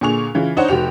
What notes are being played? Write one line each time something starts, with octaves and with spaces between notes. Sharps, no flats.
A#2 D3 G#4 C#6 F7
C#3 E3 F4
D4 D#4 C5 C#5 F#5
F1 F#4 G4 F7